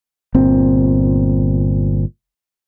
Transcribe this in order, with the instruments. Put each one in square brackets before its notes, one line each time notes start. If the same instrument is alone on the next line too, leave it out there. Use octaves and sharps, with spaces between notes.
[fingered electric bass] G1 A#2 C4